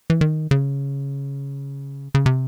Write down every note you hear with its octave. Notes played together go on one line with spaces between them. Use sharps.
E3
D#3
C#3
C#3
C3